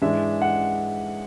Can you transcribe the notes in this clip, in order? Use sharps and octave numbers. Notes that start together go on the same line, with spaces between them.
G#2 E3 G#3 D4 E5
F#5